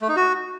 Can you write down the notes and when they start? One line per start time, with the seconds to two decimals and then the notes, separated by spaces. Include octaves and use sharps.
0.01 A3
0.09 D#4
0.16 F#4